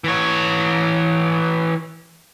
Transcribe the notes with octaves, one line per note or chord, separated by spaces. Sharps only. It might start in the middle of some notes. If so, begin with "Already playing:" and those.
E3 C#5